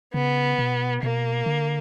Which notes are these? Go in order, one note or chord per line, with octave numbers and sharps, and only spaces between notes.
C#3 B3
B2
B2 A#3
D3